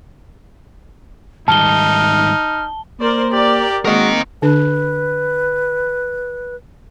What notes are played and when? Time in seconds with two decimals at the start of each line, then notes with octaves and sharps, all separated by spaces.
1.48 G#2 D#3 G3 D#4 A5 F6 G7
3.00 A#3 A#4 C5 D5
3.33 G4 A#4 D5
3.85 G#3 A#3 C4 F#4 A#4 D#5
4.42 D3 D4 B4